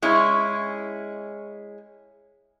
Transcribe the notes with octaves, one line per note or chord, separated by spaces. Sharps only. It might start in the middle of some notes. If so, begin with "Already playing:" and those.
G#3 C#4 E4